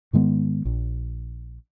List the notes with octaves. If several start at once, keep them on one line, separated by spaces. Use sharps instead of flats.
G#2 D#3 G#3 B3
A#1